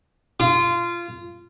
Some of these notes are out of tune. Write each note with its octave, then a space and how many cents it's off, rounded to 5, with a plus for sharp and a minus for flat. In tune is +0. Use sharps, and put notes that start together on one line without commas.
F4 -20